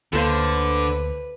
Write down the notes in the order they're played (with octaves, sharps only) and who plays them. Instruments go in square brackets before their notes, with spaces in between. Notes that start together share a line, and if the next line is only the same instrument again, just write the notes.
[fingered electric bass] D2 A#3 [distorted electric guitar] D3 [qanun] A4 C5 F5 [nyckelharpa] B4